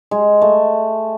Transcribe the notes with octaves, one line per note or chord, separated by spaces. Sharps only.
G#3
A3